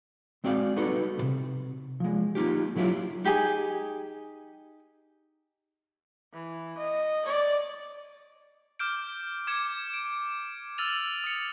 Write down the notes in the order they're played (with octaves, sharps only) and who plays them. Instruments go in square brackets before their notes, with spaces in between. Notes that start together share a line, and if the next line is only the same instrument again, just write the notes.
[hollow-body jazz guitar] G#3 C4 F#4 D5 E5 F5
G3 B3 D#4 F#4 A4
B1 C3
F3 G#3
A#3 D#4 F4 G4
D3 F#3 G3 E4 F4 G4
[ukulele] D#4 G4 G#4 G#5
[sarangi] E3
D#5
D5
[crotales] D6 F6 G6 D7
D6 G#6 C#7 E7
D7
E6 F6 A6 D#7 F7
D#6 C#7